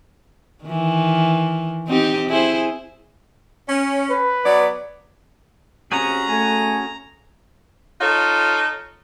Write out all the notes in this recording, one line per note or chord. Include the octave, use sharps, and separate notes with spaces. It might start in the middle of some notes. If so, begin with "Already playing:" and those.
D#3 E3
C4 D#4 G4
E4 G#4 C5
C#4
B4
F#3 B3 D5
C3 C#4 F#4 G#4 A#5
A3 G#5
D#4 F4 A4 C#5